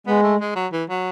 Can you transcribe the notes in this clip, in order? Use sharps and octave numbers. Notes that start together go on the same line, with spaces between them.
G#3 B3
A3
G#3
F#3
E3
F#3